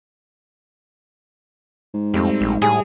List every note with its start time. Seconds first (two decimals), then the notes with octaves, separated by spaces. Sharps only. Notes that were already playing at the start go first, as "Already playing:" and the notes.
1.94 G#2
2.14 F2 G3 A3 C4
2.41 A#1
2.62 A2 G3 G#4